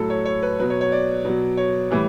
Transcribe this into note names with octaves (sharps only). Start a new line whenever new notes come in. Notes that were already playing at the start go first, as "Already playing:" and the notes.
Already playing: A2 F#3 A4
C#5
C#5
B4
B2 F#3 B4
C#5
C#5
D5
B2 F#3
C#5
A2 E3 G3